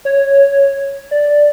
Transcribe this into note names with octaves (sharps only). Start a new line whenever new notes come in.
C#5
D5